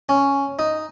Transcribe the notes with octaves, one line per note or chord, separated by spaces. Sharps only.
C#4
D#4